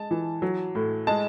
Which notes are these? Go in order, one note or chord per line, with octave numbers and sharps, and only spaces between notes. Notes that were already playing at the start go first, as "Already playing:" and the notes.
Already playing: G#3 A5
E3
F#3
A2
G#3 A5